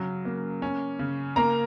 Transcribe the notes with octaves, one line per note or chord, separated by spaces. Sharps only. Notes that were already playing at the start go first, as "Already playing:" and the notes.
Already playing: C#3 F#3
A#3
C#4
C#3
A#3 A#5